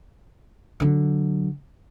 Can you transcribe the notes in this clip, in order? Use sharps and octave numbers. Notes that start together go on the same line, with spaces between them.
D3 F#3